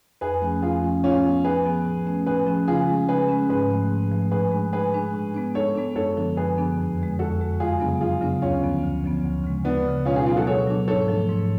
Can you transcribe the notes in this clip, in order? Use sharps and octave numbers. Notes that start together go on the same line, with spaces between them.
F2 G#4 B4
F3 A3 C#4
F2 F4 G#4
F3 A3 C#4
A2 C#4 F4
F3 B3
A2 G#4 B4
F3 B3
A2
F3 A3 C#4
A2 G#4 B4
F3 A3 C#4
C#3 F4 G#4
G#3 C#4
C#3 G#4 B4
G#3 C#4
G#2 G#4 B4
F3 A3
G#2
F3 A3
A2 G#4 B4
G#3 D4
A2 G#4 B4
G#3 D4
A2
G#3 B3 D4
A2 A4 C#5
G#3 B3 D4
F#2 A4 C#5
D3 F3 B3 D4
F#2 G#4 B4
D3 F3 B3 D4
F2
D3 G#3
F2 F#4 A4
D3 G#3
F#2 F4 G#4
C#3 F#3 B3 D4
F#2 F4 G#4
C#3 F#3 B3 D4
D2 C#4 F4
D3 F3 B3
D2
D3 F3 B3
D2
C#3 G#3
D2 B3 D4
C#3 G#3
B2 C#4 F4
F4 G#4
F#3 B3 D4 F4 G#4
F#4 A4
B2 A4 C#5
F#3 B3 D4
G#2 A4 C#5
F3 A3 D4
G#2